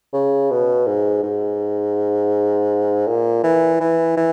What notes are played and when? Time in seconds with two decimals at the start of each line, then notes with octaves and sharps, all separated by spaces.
0.13 C#3
0.51 B2
0.87 G#2
1.23 G#2
3.07 A#2
3.43 E3
3.80 E3
4.17 E3